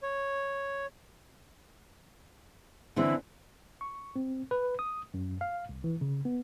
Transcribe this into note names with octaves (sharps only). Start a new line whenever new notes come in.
C#5
D3 E3 C4 E4
C#6
C4
B4
D#6
F#2
F5
C2
E3
C#3
B3